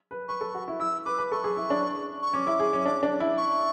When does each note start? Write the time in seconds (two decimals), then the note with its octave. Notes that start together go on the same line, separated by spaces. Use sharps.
0.11 B4
0.28 B4 C#6
0.41 A4
0.55 F#4
0.68 E4
0.80 E4 E6
1.05 B4 D6
1.18 B4
1.32 A4 C#6
1.44 G#4
1.57 E4
1.70 D4
2.22 C#6
2.34 C#4 D6
2.47 E4
2.60 G#4
2.73 C#4
2.86 D4
3.03 D4
3.20 E4
3.38 C#6